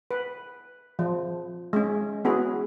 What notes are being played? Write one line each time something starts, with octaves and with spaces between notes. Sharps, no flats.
B4
F3
G#3 C#4
B3 C#4 E4 F#4 G#4